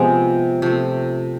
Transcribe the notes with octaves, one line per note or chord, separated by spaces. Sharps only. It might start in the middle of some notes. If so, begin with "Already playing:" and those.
Already playing: C3 F3 G#3 B3
C3 F3 A3